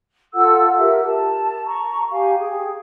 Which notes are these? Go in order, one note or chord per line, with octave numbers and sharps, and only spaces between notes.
F4 A4 F#5 E6
G4 A#4 E5
A5
A#5 C#6
G4 F5 G#5
G#4 G5